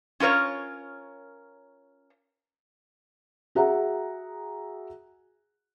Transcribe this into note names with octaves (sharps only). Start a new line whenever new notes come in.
C#4 F4 A#4 C#5
F#4 G#4 E5 F#5 A#5